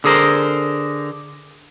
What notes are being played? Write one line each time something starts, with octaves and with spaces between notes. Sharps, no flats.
D3 G#4 A#4 C5